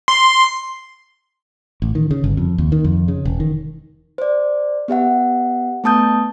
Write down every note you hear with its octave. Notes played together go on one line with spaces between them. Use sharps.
C6
A1
D#3
C#3
G1
F2
D#2
D#3
F2
C#3
E1
D#3
C5 D5
B3 G4 E5 F#5
A3 B3 A5 D#6 G6